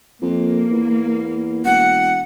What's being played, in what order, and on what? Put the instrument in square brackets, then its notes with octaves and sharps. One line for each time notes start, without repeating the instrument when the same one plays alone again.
[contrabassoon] F2 [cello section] A#3
[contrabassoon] E2
[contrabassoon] E1 [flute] F#5